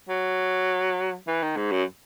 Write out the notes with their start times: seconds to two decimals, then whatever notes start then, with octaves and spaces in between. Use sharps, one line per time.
0.09 F#3
1.27 E3
1.42 D#3
1.56 G#2
1.71 F#2